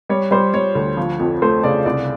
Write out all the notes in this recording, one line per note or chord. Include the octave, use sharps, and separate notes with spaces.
G3 C#5
G3 C5
G3 C#5
D2
F3
F2
A3 C5
C#3 D5
C2 D5